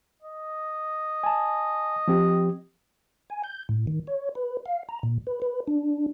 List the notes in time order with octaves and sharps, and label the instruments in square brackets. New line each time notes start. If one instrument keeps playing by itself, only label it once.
[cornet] D#5
[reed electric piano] G#5 A5
F3 C4 G4
[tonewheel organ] G#5
G6
A2
D#3
C#5
B4
F5
A#5
A#2
B4
B4
D4